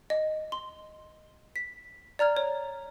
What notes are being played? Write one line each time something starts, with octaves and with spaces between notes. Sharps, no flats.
D#5
C6
B6
D5 A#5 F6 G#6
C#5